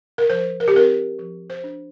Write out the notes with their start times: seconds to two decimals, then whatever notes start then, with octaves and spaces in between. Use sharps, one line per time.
0.18 A#4
0.30 F3 C5
0.60 A#4
0.68 G4
0.74 C4 A#4
1.19 F3
1.50 C5
1.64 D4